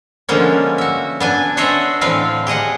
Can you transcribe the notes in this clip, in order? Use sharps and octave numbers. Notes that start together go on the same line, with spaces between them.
D3 F3 G#3 A#3 B3 C#4
F#4 E5
B3 D4 G#5
D4 C5 C#5 D#5 E5 F#5
A2 D3 E3 C4 B4 F5
G4 G#4 D#5 F#5